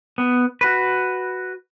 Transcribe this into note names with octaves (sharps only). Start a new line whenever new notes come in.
B3
F#4 B4